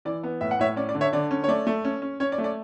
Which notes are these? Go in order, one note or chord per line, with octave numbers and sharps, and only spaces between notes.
E3 D5
B3
A2 E5
F#5
A2 C#5 E5
C#4 D5
D5
D3
C#5 E5
D3 D5
C#4
C#5
A3 D5
A3
C#4
C#4
C#4 C#5
D5
A3
D5